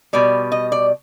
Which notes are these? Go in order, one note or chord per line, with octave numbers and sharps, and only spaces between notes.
B2 G3 D5
D#5
D5